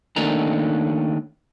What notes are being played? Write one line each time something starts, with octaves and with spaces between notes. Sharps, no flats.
D#3 A3 A#3 C#4 D4 A#5